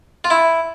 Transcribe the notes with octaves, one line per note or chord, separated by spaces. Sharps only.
F4
E4